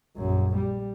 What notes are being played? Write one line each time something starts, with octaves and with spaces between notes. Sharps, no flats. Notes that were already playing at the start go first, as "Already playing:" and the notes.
A#1 F#2
G3